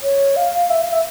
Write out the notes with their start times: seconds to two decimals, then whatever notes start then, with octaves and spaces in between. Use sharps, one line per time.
0.03 C#5
0.36 F5
0.70 E5
0.81 F5
0.92 E5